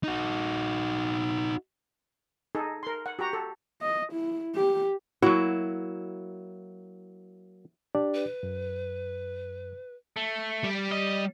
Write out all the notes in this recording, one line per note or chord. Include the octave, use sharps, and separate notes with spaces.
D#4 F#4
D#4 G#4 A4
A#4 C6
F#5
F#4 G4 A#5
A4
D#5
E4
G4
F#3 A#3 E4 F#4
D4 G4 D5
B4
F#2
A3
G3
D#5